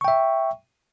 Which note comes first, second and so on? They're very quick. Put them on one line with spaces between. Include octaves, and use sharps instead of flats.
C#6 G5 E5